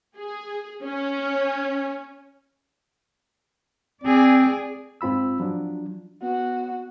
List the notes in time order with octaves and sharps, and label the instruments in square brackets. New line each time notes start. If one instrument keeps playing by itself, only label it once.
[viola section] G#4
C#4
[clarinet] C4 [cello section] G#4 D5
[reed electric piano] G#2 C4 F4 B5 E6
F3 F#3 D4
[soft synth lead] B3 [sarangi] F#4